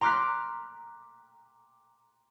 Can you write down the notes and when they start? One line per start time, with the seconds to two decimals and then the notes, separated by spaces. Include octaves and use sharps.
0.01 A#5 C6 D6 F6 F#6 B6